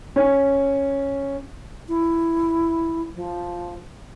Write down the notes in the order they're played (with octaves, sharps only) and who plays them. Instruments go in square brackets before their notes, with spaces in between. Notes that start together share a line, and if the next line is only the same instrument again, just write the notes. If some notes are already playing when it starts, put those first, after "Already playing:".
[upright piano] C#4
[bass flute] E4
F3